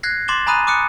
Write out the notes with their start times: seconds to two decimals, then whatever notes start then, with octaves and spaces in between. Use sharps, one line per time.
0.03 F#6 G#6 A#6 C7
0.28 C6 D6 A6 E7 G7
0.47 G#5 A#5 B5 D#6 F#6 D#7
0.67 D6 D#6 F#6 C#7